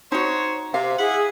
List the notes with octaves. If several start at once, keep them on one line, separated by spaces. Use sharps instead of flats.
D#4 F#4 C5 C#5
C3 F5
E4 G#4 E5 F#5